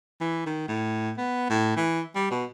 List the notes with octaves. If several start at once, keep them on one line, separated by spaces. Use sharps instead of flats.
E3
D#3
A2
B3
A2
E3
G3
B2